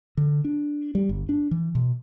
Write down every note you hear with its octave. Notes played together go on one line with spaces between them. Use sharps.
D3
D4
G3
G1
D4
E3
B2